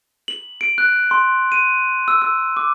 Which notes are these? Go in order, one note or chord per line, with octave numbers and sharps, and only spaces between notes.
F#7
D7
F#6
C6
D#7
E6
E6
D6